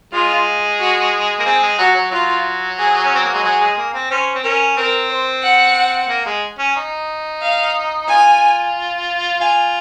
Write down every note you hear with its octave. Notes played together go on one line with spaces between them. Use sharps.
G#3 F4
F#4
A#3
C4 G#4
G#3
F#3 F#4
F#3
F#3 F4
G#4
C#4
C4
A#3
G#3
F#3 G#4
G#3
A#3
C4
C#4 C5
C4
C#4 A#4
C4 A#4
C5
F#5
A#3
G#3
C#4
D#4
F5
F4 G#5
F4 G#5